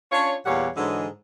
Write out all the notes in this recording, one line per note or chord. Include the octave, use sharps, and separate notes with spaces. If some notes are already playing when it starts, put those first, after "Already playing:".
C#4 D4 F4 C#5
E2 A#2 G3 C#5 F5 F#5
G#2 D3 E3 F#3 G#3